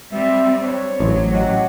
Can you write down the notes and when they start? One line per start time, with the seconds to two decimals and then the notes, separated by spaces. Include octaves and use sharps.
0.12 G3 C4 E5
0.63 D4 C5 C#5
1.00 A1 F#3
1.33 F#4 G4 C#5 D#5 F#5 G#5